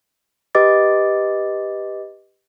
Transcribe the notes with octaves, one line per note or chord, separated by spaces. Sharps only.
G4 B4 D#5 D6 A6